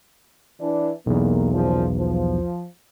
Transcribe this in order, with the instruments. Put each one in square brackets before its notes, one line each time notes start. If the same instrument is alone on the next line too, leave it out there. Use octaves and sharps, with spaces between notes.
[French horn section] E3 D4
[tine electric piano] B1 E2 [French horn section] A#3
[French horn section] A#2 C#3 F3
F3